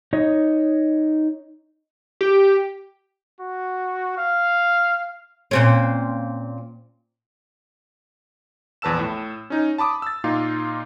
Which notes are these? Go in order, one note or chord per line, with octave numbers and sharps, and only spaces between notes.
D#4 C#5 D#5
G4
F#4
F5
A#2 C4 C#4
A#1 E2 B4 A5 E6 E7
A2
C#4 D#4
A5 B5 D6 D#6
E6 A6
A#2 A#3 D#4 F4